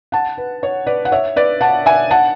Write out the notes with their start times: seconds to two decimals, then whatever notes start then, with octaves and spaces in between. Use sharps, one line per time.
0.12 F#5 A5
0.37 B4
0.63 C#5
0.86 B4 D5
1.05 F#5
1.12 C#5 E5
1.36 B4 D5
1.61 F#5 A5
1.86 E5 G#5
2.11 F#5 A5